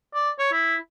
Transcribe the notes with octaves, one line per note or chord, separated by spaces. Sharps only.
D5
C#5
E4